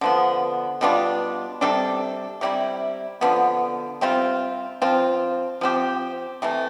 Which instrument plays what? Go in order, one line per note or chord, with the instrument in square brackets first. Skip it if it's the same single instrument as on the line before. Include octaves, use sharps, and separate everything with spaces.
[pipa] D3 F3 B3
B2 G3 D4 F4
C3 G3 D4 A4
C3 G3 C4 E4
D3 F3 B3
C3 G3 C4 F4
F3 C4 F4
F3 C4 G4
C3 E3 A3